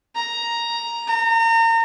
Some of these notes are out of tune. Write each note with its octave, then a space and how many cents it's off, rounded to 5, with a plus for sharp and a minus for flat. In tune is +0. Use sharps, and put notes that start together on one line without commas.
A#5 +5
A#5 -35